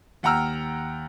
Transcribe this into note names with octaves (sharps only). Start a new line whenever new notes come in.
D#2 F#5 G5 A#5 E6 F6